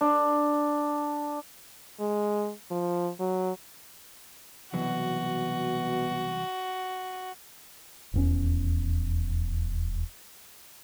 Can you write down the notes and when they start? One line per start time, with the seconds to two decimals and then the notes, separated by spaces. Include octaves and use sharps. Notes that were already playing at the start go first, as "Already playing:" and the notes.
0.01 D4
2.00 G#3
2.71 F3
3.20 F#3
4.74 C2 B2 E3 F#3 F#4
8.14 D#1 E2 C#4